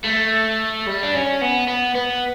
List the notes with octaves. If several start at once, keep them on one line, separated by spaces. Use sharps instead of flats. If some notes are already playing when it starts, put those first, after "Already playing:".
A3
G3
D4
C#4
B3
B3
B3